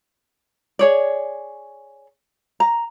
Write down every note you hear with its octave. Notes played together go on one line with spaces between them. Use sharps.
G#4 C#5 D5
A#5